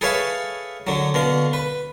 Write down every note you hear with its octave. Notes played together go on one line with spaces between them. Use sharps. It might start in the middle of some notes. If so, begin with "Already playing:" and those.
G#4 A4 B4 C#5 E5 F5
D3 F#3
B2 D3 F5
B4